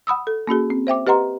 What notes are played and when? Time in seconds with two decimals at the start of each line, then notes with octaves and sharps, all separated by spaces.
0.07 F#5 B5 D#6 E6
0.27 A4
0.47 A#3 C#4 F#4 G#4
0.70 C4
0.87 C5 E5 G5 D6
1.07 G4 B4 D#5 F#5 A#5 C6